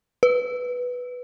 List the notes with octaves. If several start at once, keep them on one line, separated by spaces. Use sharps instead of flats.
B4